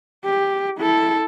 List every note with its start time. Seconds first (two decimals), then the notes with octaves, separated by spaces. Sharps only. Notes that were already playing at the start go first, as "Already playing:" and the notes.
0.25 G4
0.78 E4 A4